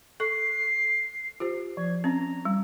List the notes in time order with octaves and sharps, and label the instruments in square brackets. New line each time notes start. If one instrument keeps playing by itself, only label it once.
[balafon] A4 C#6 [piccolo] C7
[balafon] F4 G4 C5
[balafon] F3 [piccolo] G#6
[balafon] C4 C#4 [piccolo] A#5
[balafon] G3